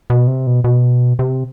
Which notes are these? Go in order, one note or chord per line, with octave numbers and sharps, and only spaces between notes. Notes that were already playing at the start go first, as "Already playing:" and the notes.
B2
C3
B2
B2
C3